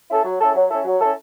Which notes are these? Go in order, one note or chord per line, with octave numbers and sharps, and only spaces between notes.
C#4 E4 A4
F#3
C#4 E4 A4
F#3
C#4 E4 A4
F#3
C#4 E4 A4